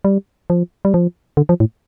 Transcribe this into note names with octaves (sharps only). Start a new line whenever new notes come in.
G3
F3
G3
F3
D3
F3
A2